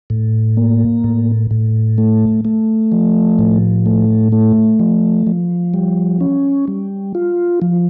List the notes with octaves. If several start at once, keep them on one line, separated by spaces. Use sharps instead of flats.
A2
A#3
A2
A2
A3
A3
F3
A2
A3
A3
F3
F3
G3
C#4
G3
F4
F3